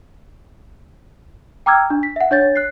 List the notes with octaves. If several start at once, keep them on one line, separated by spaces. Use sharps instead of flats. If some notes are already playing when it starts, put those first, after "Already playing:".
G5 A#5 D6 E6 F6 G#6
D4
B6
E5 F#5
D4 C#5 G6 A6
F#6 C7